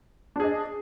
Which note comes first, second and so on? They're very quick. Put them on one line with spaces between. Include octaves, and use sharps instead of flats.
D4 G#4 D#5